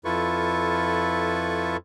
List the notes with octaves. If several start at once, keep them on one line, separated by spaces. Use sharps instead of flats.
F2 E4 F4 A4 B4 C#6